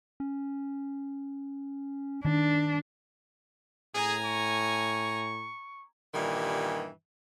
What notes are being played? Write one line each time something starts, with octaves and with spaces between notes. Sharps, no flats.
C#4
D#3 D4
A2 G#4 G#5 A#5
C#6
G2 A#2 D#3 E3 G3